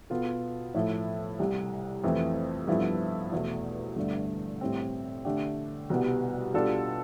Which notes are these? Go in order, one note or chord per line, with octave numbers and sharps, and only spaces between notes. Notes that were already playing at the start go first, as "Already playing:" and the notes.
B2 B3 F4 A4
A2 F3 A3 E4 A4
C2 C3 G3
F2 E3 A3 C4
G2 F3 B3 E4 A4
E2 B2 A3
G2 D3 A3 D4
A2 G3 C4
D3 A3 D4 G4
C2 B2 G3 B3
B2 G3 D4 F4 A4